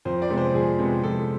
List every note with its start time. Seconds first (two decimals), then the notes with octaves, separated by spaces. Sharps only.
0.05 F2 C5
0.22 D5
0.30 C3 G#3 B3
0.37 C5
0.54 F2 G#4
0.79 C3 G#3 B3
1.03 F2 A4